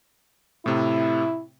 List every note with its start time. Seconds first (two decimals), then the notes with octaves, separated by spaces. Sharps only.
0.66 A2 C3 E4